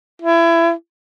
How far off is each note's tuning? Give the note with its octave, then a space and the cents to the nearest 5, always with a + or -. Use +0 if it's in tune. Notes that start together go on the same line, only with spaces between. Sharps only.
E4 +25